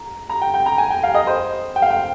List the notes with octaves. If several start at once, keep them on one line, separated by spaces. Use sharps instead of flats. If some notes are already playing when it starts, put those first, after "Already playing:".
Already playing: A#5
A#5
G5
G5
A#5
G#5
G5
F5
D#5
C5
G5
F5
G5